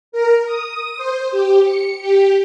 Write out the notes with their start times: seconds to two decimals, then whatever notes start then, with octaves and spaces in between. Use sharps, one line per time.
0.12 A#4
0.46 D#6
0.97 C5
1.31 G4
1.65 C#7
2.01 G4